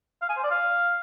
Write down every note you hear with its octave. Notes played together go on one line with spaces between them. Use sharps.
F5
G#5
C5
D5
F5